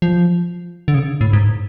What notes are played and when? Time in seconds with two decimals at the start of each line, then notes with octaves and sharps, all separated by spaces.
0.02 F3
0.88 D3
0.94 C#3
1.21 A2
1.33 G#2